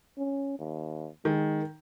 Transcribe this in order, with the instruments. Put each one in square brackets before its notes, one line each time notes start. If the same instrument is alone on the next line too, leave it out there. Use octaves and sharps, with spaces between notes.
[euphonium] C#4
D#2
[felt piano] D#3 [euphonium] G#3